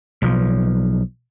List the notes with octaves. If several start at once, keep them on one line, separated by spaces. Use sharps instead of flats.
B1 F3